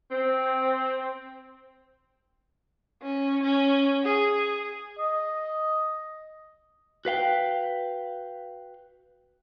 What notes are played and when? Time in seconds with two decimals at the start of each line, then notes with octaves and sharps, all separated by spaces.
0.10 C4
3.02 C#4
3.43 C#4
4.04 G#4
4.99 D#5
7.05 F#4 B4 F5 G5